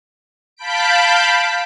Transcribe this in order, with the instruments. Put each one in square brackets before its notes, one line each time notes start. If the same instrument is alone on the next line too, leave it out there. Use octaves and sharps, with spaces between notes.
[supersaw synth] F5 A5 B5 G6 B6 D7